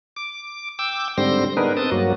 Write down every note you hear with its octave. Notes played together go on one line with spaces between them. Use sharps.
D6
G5 D6 E6
G#2 D3 G3 C4 C6 A#6
B3 D4 D#4 G#4 A#4 B4
C4 A5 D#6
G2 F#3 A#3 F#4